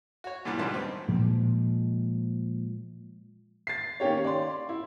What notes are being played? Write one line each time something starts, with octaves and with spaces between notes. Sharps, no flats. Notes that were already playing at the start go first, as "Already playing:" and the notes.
F#4 C#5
G2 A#2 E3 G3 B3 D6
C#2 G2 D#3 B4 A5 C6
C4
A#2 F3 G#3
A6 C7
D#3 A#3 C#4 G4 C#5
D5 C6
E4